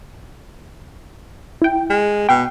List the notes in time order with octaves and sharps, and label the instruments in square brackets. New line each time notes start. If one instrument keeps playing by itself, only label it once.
[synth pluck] E4 G5
[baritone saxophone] G#3
[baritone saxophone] B2 [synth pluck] G5